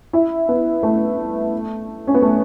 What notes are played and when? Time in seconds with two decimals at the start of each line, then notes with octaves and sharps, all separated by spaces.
0.13 E4
0.49 B3
0.83 A3
2.07 C#4
2.14 B3
2.22 A3